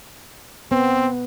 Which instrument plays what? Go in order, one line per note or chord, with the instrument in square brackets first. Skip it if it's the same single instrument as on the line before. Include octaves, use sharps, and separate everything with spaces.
[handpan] B3 [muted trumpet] C4